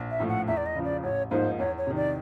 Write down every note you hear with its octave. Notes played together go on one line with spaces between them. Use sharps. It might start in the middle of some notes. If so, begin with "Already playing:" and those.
Already playing: A#1
E5
A2 F3 A3
F#5
E2 E5
D5
D#5
C#3 F3
D5
A1 C#5
G#2 F3 A#3 D#4 C5
E2 C#5
C#5
C3 D#3
D5